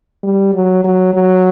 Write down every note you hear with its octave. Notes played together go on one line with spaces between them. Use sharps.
G3
F#3
F#3
F#3